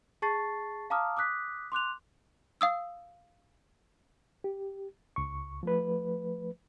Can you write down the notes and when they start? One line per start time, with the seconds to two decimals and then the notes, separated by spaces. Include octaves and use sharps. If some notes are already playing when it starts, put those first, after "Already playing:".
0.22 G#4 A5 C#6 A6 C7
0.90 F5 A5 A#5 D6 D#6 F6
1.17 D6 D#6 F#6 B6
1.72 C6 D6 F#6 F7
2.61 F5 D#6 E6
4.44 G4
5.16 C#2 C#6
5.63 F3 A3 B4